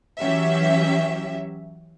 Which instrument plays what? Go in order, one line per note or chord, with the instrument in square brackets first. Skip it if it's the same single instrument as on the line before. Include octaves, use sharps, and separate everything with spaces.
[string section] E3 F#3 C#4 G4 E5